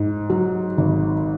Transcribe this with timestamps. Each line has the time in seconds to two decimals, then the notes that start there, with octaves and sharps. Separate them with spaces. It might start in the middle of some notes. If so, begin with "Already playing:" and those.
Already playing: G#2
0.30 F#3
0.78 G#1